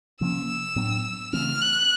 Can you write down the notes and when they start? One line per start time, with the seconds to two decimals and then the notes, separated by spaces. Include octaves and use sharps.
0.21 C3 F3 A#3 C#4 E6
0.76 A2 F#3 B3 D4
1.33 C#3 E3 A3 C4 F6
1.61 F#6